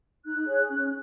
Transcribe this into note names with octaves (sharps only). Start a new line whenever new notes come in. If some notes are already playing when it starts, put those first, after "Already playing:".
D#4 F#6
G#4 C#5
C#4